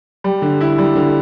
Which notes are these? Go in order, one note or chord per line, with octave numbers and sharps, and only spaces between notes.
G3
D3
E4
G3
D3